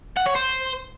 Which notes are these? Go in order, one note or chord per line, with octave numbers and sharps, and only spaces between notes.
F#5
C#5
C5